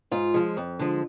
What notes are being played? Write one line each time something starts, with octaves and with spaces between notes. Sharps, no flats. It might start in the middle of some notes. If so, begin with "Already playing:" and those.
G#2 F4
F3 G#3
F2
D3 F3 G#3